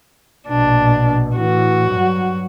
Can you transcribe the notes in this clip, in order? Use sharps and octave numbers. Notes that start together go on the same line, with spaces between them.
A#1 B2 D4
A2 E3 F#4
G2 F#3